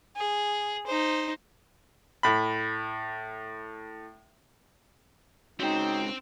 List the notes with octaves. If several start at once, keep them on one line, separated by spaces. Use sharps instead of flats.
G#4
D#4 C5
A2 B5
G#3 C4 C#4 D#4 F#4 C5 G5